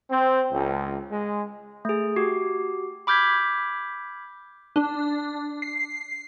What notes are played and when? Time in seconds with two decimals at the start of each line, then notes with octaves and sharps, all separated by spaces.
0.10 C4
0.51 C#2
1.11 G#3
1.85 A3 G#4
2.16 F#4 G4
3.07 B5 D6 F6 G6 G#6 B6
4.76 D4
5.62 C7